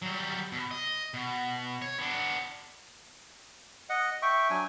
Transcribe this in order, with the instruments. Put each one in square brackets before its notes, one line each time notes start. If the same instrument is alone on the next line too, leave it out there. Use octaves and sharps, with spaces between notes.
[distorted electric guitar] F#3 G3
B2
D#5
B2
C#5
B3 D4
[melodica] D#5 F#5
E5 G5 C#6
F#3 D4 G#5